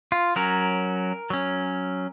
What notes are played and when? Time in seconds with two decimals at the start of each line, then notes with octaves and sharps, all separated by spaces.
0.12 F4
0.36 F#3 C#4 A#4
1.30 F#3 C#4